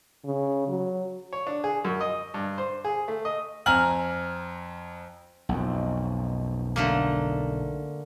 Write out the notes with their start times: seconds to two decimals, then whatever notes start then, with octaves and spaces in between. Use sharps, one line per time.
0.25 C#3
0.68 F#3
1.33 C#5
1.47 D4
1.64 G#4
1.85 F#2
2.01 D#5
2.34 G2
2.58 C5
2.85 G#4
3.08 A3
3.25 D#5
3.66 F2 G#5 A#5 F6 F#7
5.49 B1 F2
6.76 D3 A3 A#3